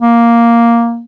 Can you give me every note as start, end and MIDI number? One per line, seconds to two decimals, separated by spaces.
0.02 1.03 58